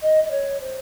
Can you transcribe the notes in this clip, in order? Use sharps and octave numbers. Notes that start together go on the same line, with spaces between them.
D#5
D#5
C#5
C5